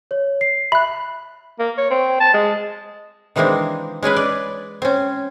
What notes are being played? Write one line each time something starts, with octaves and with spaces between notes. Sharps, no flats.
C#5
C7
E5 B5 F#6
A#3
C#5
C4
A5
G#3
D#3 E3 G#3 A#3 C4 D4
G#3 C#4 G#4 B4
D5
C4 C#4